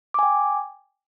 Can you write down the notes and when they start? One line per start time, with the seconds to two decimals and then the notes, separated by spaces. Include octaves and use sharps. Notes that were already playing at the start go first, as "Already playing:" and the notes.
0.14 D6
0.19 G#5
0.23 G5